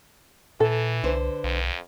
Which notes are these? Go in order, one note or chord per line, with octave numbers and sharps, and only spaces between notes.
A#2 E3 A4
C2 D3 B4 C5
B1 F2